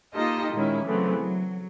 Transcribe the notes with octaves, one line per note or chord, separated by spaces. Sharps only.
A#3 D#4 F4 G4 A4 D#5
A#2 D#3 G#3 C#4 E4
C#3 E3 F#3 A3 B3 C4
F#3